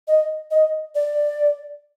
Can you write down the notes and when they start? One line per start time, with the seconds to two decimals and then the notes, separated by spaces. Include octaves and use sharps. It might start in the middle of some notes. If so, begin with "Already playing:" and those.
0.08 D#5
0.51 D#5
0.95 D5